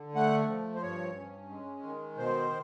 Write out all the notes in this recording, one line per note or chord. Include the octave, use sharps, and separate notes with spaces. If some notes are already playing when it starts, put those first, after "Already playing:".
Already playing: D3
A3 F#5
F3
C5
G2 C#5
C#4
G#3
D#3
B2 C5